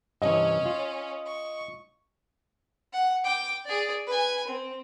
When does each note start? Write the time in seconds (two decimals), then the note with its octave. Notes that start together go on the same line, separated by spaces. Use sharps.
0.22 G2 C3 E3 C#4 C#5 D#5
0.65 F4
1.26 C#6
2.93 F#5
3.24 G5 D6
3.65 G#4 D5
4.07 B4 G#5
4.47 C4